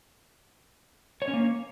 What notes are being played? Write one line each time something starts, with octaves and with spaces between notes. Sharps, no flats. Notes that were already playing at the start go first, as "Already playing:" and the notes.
C#5
C#4
A#3